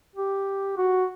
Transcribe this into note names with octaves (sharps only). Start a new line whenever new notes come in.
G4
F#4